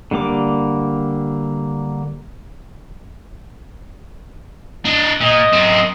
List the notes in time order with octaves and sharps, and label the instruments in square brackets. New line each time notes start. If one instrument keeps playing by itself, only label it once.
[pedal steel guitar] D3 G3 A#3 D6
[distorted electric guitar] D4 D#5
[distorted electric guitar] A#2 [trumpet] D#5
[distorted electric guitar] F#2 C4